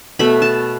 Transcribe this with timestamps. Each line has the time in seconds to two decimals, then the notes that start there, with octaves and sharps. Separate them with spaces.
0.19 B2 A3 B5
0.42 A5